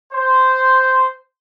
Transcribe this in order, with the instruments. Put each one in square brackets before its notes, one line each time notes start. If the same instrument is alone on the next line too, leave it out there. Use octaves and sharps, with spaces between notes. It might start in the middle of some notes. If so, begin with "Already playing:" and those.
[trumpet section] C5